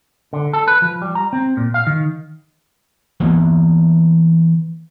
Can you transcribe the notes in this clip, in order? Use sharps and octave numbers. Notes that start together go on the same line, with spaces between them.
D3
A4
B4
F3
G3
A#5
C4
A#2
F5
D#3
E3 A#3 B3